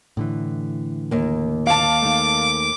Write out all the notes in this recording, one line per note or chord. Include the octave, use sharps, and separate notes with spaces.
A2 D3 E3
D#2 A#3
F5 A5 D6
D#3 A3